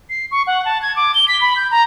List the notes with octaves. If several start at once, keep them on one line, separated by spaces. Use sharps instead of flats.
C7
C#6
F#5
A5
G#6
D6
G7
B6
B5
G6
A#5